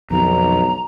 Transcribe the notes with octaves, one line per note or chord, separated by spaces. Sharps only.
B1 F2 B2 D#3 A#5